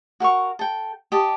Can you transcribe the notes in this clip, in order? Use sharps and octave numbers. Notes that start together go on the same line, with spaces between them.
F#4 A#4 F5 C#6
A4 G5
G4 D#5 A5